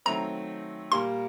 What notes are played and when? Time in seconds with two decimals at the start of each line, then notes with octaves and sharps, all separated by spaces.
0.06 D#3 F#3 A3 C4 A#5
0.92 A#2 G3 A#3 C6